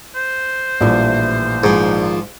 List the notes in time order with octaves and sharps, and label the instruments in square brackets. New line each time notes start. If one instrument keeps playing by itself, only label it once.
[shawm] C5
[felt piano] A#1 [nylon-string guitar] A2 E3 G3
[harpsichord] G#2 [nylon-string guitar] D#3 F3 B3